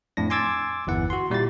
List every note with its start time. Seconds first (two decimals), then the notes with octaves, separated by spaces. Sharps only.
0.17 F2 A2 D4 A#6
0.30 G#5 C6 D6 E6 G#6 A6
0.87 G1 E2 E3 F#5
1.10 F#4 C6
1.30 A#2 G3 E4 G4 A6